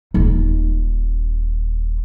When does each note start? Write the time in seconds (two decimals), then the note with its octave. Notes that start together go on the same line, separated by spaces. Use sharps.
0.14 D#1 D#4